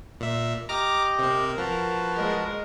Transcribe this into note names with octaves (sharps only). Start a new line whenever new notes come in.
A#2 E5
G4 D#5 A#5 D6 F6
C3 C4 A#4
F3 F#4 B4 A5
G#3 A#4 D#5